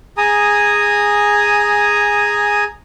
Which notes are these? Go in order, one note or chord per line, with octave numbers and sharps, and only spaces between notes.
G#4 G#5 A#5 D#6